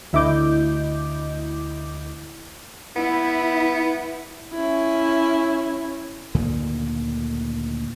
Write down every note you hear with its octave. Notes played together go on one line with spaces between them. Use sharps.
D2 E4 D#5 D6 G6
B3 E4
C#4 E4
D2 A#2 D3 D#3